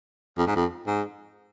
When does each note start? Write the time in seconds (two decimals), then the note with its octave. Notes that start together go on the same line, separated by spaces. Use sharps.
0.38 F2
0.47 G#2
0.56 F2
0.87 G#2